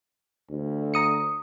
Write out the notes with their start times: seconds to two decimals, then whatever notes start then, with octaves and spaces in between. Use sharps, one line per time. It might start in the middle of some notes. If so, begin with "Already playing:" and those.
0.50 D2
0.94 A#5 D#6 C#7